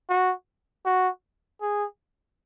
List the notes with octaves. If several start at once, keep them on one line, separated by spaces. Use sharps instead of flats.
F#4
F#4
G#4